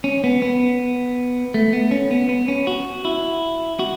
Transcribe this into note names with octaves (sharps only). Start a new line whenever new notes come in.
C#4
B3
B3
A3
B3
C#4
B3
B3
C#4
F#4
E4
F#4